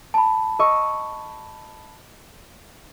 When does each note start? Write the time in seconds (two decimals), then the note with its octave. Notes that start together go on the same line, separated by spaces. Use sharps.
0.14 A5 B5
0.59 D#5 C#6 E6